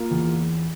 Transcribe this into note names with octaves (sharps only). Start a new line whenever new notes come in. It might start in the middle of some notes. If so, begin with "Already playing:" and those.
Already playing: A#3 F4
E2